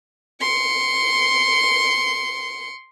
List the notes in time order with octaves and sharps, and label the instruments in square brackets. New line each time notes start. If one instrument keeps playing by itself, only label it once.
[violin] C6 C#7